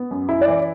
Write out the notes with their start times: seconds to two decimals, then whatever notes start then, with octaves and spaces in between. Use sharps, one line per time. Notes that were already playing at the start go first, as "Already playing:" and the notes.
Already playing: B3
0.11 F#2
0.29 E4
0.41 D5
0.48 E3